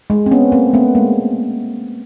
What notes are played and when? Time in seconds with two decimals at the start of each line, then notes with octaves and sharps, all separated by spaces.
0.10 G#3
0.26 C4
0.31 B3 C#4
0.52 A#3 C4
0.73 A3 B3
0.95 G#3 A#3